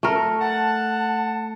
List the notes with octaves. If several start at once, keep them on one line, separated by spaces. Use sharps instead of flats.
A3 A#4
F#5 A5